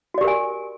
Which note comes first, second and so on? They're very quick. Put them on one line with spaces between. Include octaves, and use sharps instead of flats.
F#4 D5 G4 A#4 G#5